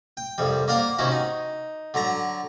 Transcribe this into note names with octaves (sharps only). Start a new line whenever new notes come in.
G5
C2 F2 G3
A#3 D5 F5 F#5
C3 D#3 C#4 E4 F#4
D#4
D3 F#3 A5 A#5